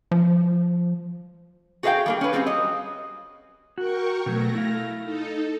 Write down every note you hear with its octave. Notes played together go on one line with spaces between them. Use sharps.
F3
F#4 G#4 B4 E5 F5 G5
G3 A#3 G#4
C#4 B4
G3 C4 G#4 C#5 F5
F#3 D#5
F#4 A#4 G5 C#6
B2 F#3 A3 A#6
E4 F5
D#4 A4